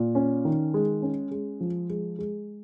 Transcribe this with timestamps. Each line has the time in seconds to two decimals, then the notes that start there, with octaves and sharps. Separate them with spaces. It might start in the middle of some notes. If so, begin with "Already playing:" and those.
Already playing: A#2
0.15 C#4
0.45 D#3
0.74 G#3
1.02 C#4
1.31 G#3
1.60 F3
1.90 G#3
2.19 G#3